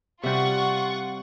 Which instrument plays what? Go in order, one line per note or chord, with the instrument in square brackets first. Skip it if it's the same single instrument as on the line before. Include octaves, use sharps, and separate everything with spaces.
[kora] C3 G3 [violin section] F4 F#5 C#6